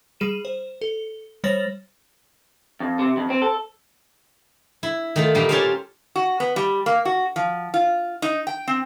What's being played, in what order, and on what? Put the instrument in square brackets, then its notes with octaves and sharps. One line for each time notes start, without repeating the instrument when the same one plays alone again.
[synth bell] G3 G#4 D#7 E7
C5
A4
G3 C5 C#5 A6 A#6 F#7
[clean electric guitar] F2
C3
F2
C4
A4
[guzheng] E4
D#3 A3 F4
A#2 D#3 G3 A#3
C#4 F4 G4 A4 C5 F5
[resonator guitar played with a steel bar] F#4
B3
G3
A#3
F#4
F3
F4
D#4
G5
C4